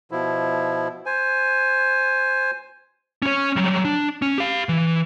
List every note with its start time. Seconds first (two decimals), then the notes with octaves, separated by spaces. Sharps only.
0.11 B2 F3 E4
1.06 C5 G#5
3.22 C#4 C#5
3.56 F#3 G3
3.85 D4
4.22 C#4
4.38 G4 F5
4.69 E3